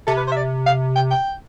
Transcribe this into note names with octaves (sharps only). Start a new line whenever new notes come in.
C3 A4
B4
C5
E5
D5
F5
G5
G5